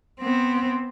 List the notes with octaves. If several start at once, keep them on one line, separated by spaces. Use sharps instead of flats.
B3 C4